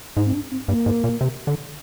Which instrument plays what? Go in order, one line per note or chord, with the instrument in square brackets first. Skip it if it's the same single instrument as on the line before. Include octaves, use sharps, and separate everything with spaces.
[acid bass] G#2 [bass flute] D#4
[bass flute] C4
D4
C4
[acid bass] G2 [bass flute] A#3
[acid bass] G#2
A#2
C3
D3